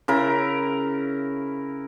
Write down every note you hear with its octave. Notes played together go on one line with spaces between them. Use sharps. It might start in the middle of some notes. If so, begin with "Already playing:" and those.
C#3 E4 A#4